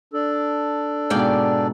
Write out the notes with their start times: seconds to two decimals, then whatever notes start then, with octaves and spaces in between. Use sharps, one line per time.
0.13 D4 A4
1.10 G#2 B2 D5 F5 G5